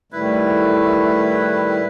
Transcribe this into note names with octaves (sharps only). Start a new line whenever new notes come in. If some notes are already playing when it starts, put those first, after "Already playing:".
A2 D#3 G3 A3 E4 B4